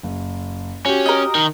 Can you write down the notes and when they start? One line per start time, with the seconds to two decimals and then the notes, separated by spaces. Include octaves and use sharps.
0.03 F#1
0.86 C#4 F#4 G4
1.06 A#4 D#5
1.35 D#3